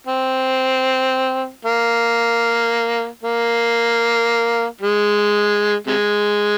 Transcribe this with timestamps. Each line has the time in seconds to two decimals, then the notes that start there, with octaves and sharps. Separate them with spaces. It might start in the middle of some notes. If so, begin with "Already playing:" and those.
0.07 C4
1.65 A#3
3.23 A#3
4.81 G#3
5.87 C3 G#3